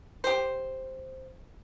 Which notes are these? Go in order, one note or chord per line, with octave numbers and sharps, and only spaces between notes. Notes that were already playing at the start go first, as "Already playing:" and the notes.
G4 C5